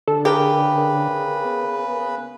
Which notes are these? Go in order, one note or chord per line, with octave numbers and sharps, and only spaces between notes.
D3 A4
C#3 G4 G#4 A#4 B4
B3